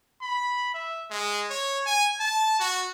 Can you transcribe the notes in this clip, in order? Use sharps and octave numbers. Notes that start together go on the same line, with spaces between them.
B5
E5
G#3
C#5
G#5
A5
F#4